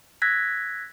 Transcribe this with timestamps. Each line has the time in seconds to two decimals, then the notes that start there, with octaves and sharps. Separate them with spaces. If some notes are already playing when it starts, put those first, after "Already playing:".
0.22 E6 F#6 G#6 A#6 B6